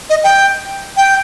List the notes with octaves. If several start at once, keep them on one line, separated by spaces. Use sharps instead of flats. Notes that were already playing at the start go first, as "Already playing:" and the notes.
D#5
G5
G5